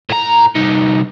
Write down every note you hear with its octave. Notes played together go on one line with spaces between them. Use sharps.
A2 A#5
C2 D#4